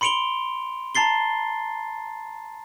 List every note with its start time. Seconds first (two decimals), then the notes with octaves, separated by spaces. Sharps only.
0.01 B5 C6 C#7 D7 F7 G7
0.95 A5 A#5 A6 C7 G7